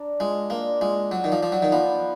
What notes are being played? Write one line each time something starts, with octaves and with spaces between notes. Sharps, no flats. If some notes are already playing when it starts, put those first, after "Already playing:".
Already playing: D4 A#4
G#3 F4
A#3 D4
G#3 F4
F#3 D5
D#3
F3
F3 D5
F#3
D#3
F3 B3